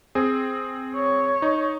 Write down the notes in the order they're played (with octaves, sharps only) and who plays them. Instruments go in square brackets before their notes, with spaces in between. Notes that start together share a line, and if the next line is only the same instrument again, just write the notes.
[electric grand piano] C4 G#4
[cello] C#5
[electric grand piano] D#4